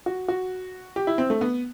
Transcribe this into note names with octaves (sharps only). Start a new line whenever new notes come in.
F#4
F#4
G4
E4
C4
A3
B3